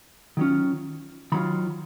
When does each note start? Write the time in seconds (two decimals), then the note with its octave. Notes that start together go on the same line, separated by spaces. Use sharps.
0.37 D#3 F#3 C#4 F4
1.32 D#3 F#3 C#4 F4 B5